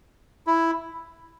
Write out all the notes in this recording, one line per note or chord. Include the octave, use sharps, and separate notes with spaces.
E4